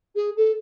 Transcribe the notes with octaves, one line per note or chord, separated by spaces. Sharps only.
G#4
A4